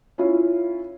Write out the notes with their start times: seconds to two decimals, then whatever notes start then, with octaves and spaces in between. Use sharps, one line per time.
0.18 C#4 E4 F4